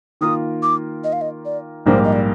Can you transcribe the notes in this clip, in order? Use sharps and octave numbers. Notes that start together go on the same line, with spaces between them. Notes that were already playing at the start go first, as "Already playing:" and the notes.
D#3 A#3 F4 A#4 D#6
D6
D#5
F5
D#5
D5
A#1 G#2 G3 A#3 C5
D#5
D5